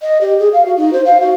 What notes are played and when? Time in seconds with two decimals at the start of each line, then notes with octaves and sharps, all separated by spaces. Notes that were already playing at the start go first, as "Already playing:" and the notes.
0.02 D#5
0.21 G4
0.39 G#4
0.53 F5
0.65 F#4
0.77 D#4
0.93 C5
1.05 F5
1.21 F#4